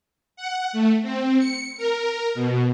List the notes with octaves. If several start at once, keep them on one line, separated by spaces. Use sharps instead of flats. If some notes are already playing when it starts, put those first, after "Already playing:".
F#5
A3
C4
C#7
A#4
B2